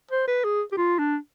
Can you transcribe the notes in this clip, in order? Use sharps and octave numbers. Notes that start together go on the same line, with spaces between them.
C5
B4
G#4
G4
F4
D4